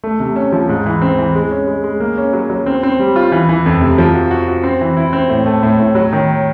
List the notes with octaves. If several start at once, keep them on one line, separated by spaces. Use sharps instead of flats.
A3
C3
C#4
F3
G#2
E3
C4
E3
G#3
C#4
G#3
G#3
A#3
C#4
F#3
F#3
C4
C4
G3
F4
E3
E3
F2
C3
F3
F#4
F#4
F#4
C4
E3
E4
C4
A2
A3
A2
A2
F#3
D#3